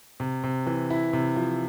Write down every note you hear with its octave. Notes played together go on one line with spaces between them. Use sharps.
C3
C3
E3
E4
C3
F3